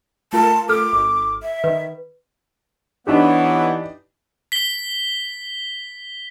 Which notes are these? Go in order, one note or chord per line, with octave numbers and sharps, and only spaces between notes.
A3 F4 A#4 A5
A4 D6 F6
G#1
E5
D#3 B4
E3 B3 D4 D#4 G4 B4 C#5 E5
B6 G7